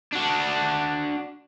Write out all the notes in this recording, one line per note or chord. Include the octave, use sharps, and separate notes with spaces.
D4 F#4